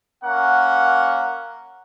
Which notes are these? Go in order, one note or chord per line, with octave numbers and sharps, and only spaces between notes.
A#3 C#4 F#5